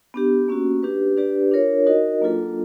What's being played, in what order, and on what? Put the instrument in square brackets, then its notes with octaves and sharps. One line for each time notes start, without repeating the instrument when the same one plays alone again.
[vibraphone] B3 D4 G4
A#3 C#4 F#4
D4 G4 B4
D4 G4 B4 D5
D4 F4 A#4 C#5
D#4 F#4 A#4 D#5
F#3 A#3 D4 F4 A4